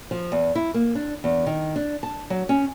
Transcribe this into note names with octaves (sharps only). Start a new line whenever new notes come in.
F3
E2
E4
A#3
D4
E2
D#3
D4
A5
F#3
C#4